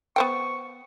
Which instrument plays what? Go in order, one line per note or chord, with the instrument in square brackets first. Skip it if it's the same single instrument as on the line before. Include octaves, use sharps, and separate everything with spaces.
[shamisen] B3 C5 G5 [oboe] C#6